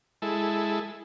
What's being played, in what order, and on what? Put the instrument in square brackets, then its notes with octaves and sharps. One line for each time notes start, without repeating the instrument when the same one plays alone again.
[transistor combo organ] G#3 E4 A4